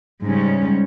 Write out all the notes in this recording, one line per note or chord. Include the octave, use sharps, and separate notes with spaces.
G#2 C#3 G3 C#4